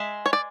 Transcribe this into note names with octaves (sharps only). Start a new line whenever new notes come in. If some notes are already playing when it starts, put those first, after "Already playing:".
Already playing: G#3 E5
C#5
D5